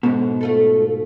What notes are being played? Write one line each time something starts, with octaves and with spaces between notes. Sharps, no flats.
G#2 B2 D3
A3 F4 A4